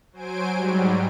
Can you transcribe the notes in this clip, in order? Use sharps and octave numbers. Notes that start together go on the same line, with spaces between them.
F#3 C5 G#5 D7
G#2 F#3 G3